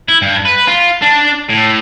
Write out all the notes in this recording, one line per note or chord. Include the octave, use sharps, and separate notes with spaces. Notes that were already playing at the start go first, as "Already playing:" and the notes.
E4
G2
B4
F4
D4
A2